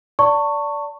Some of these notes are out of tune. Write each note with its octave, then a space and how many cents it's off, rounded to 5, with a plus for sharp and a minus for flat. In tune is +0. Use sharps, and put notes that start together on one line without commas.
D5 -20 A5 +30 C#6 +0